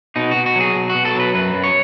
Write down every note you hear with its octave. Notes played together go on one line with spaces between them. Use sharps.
B2 D#4
B2 F#4
F#4
F#3 G#4
B2
F#4
B2
A4
F#3 B4
F#2 B4
F#2
C#5